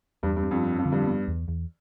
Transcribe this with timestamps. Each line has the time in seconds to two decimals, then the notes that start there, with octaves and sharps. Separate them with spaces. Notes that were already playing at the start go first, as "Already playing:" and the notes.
0.23 E2 G2
0.36 G2
0.43 C4
0.51 F2
0.64 C4
0.78 F2
0.85 D3
0.92 G2
1.07 B3
1.28 E2
1.48 E2